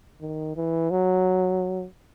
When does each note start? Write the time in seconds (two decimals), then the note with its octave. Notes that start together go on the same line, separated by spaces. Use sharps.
0.21 D#3
0.56 E3
0.91 F#3